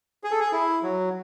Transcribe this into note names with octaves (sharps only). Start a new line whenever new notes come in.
G#4
A4
G#4
E4
F#3